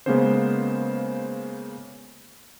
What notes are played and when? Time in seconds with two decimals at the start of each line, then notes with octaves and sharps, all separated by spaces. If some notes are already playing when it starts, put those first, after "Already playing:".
0.06 C#3 G#3 A#3 B3 C#4 C5